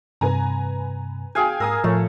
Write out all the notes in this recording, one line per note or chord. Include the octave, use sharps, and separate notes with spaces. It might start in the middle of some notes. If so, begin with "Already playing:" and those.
G2 C3 B4 G#5 A#5
F#4 G#4 F5 G5 G#5
G#2 A#4 G#5 D#6 E6
A2 F3 A3 C#5